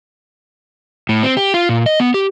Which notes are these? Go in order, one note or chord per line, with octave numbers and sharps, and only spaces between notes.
A2
C4
G4
F4
A#2
D#5
B3
G4